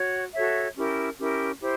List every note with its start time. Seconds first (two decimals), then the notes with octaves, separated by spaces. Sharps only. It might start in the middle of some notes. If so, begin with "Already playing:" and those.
Already playing: F#4 C#5
0.33 F#4 A4 C#5 E5
0.76 C#4 E4 G4 A#4
1.18 C#4 E4 G4 A#4
1.60 E4 G4 C5